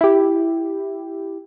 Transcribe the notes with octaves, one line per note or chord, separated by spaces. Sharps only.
E4 G4